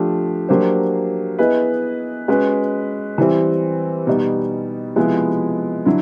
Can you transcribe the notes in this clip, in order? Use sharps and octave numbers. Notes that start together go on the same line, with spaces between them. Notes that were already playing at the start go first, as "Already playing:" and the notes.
Already playing: F3 A3 D4 G4
F#3 A#3 D4 G4 C5
B3 E4 G#4 B4 D#5
G#3 C#4 F#4 B4
E3 G3 C4
B2 G3 B3 D#4
C3 F3 G#3 B3 E4
D3 F#3 E4